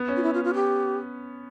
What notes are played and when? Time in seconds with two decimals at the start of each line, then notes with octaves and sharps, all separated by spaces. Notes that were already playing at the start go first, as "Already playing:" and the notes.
Already playing: B3
0.08 C#4
0.16 F4
0.23 E4
0.34 F4
0.44 F4
0.54 G4